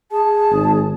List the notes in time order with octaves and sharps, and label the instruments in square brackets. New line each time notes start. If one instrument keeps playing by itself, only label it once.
[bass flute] G#4 [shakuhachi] A5
[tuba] G#1